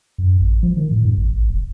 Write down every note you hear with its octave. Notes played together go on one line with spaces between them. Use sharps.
F#2
A1
F3
D#3
A2
G2
A1
A1
F1